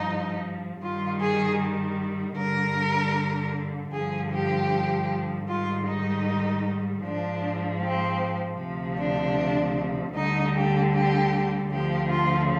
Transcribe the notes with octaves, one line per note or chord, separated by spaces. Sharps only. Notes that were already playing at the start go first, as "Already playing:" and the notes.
Already playing: G2 F3 D#4
G2 D#3 G3 F4
G#4
G2 D3 G3 A#4
G2 D3 F3 G#4
G4
G#2 D#3 G3 F4
D#4
G#2 F3 D4
C4
D2 C3 F3
D4
D2 D3 G3 D#4
G4
G4
D2 D3 F3 G4
F4